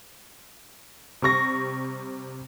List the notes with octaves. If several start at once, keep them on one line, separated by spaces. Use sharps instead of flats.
C3 G3 C#6 A#6